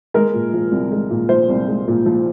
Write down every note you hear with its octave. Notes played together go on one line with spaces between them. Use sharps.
G#3 A#4
A#2
F3
C2
G#3
A#2
F3 C5
C2
G#3
A#2
F3